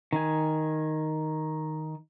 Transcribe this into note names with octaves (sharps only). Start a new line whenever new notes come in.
D#3 G#5